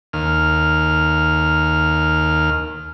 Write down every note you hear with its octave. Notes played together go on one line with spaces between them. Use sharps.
D#2 F6